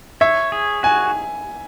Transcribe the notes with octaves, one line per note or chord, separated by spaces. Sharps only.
C#5 E5
G#4
F#4 G#5